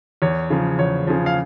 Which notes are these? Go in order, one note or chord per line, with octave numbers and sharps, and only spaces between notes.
E2 C#5
C#3 F3
E2 C#5
C#3 F3
F5